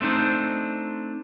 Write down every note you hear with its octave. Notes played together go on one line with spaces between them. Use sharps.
A3 C4 D4 D#4 C5